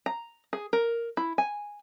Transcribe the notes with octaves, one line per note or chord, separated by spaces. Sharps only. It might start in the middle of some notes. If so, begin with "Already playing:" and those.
A#5
G#4
A#4
E4
G#5